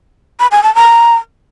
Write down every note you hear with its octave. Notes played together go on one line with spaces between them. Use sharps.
B5
G#5
A5
A#5